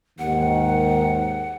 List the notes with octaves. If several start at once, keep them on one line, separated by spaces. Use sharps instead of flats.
D#2 G#2 D#3 F#5